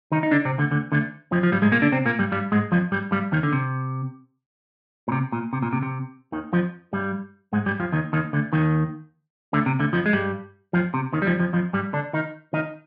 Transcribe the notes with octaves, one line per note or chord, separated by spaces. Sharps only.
D#3 D#4
D#4
D3 D4
C3 C4
D2 D3
D2 D3
D2 D3
F2 F3
F3
G2 G3
G#2 G#3
A#2 A#3
D3 D4
C3 C4
A#2 A#3
G2 G3
G2 G3
G#2 G#3
F2 F3
G2 G3
G2 G3
D#2 D#3
D3
C3
A#2
C3
A#2
C3
A#2
C3
C3
D#2 D#3
F2 F3
G2 G3
G#2 G#3
G2 G3
F2 F3
D#2 D#3
D#2 D#3
D2 D3
D#2 D#3
D2 D3
C3
D2 D3
F2 F3
G#3
G2 G3
F2 F3
C3
D#2 D#3
G3
F2 F3
F2 F3
F2 F3
G2 G3
D3 D4
D#3 D#4
D#3 D#4